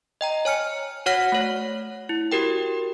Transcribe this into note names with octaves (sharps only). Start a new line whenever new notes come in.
D#5 G5 A#5
C#5 G#5 F6 C#7
F#4 C#5 F#5 F6 A#6 B6
A3 C#5
E4
F#4 G4 A#4 G5